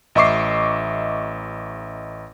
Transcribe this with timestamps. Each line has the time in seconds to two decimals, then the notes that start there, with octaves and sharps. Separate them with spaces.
0.15 A1 D#5 E5 C#6 D6 C7